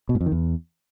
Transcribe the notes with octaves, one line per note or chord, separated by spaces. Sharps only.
B2
G#2
F2
D#3
E2